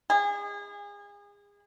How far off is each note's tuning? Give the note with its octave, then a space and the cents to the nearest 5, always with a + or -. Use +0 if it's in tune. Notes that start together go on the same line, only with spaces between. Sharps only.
G#4 -30